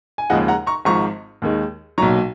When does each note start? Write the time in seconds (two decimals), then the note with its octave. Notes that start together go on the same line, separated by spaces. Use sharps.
0.18 G#5
0.30 D#2 C#3 F3 G#3 D#5 F#5
0.48 F#5 A#5
0.67 A#5 C#6
0.85 G#1 G#2 F3 A#5 C#6
1.42 D#2 D#3 G#3
1.98 B1 A#2 F#3 A#5 C#6